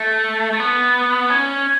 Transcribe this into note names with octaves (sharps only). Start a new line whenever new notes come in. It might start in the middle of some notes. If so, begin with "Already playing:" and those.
Already playing: A3
A3
B3
C#4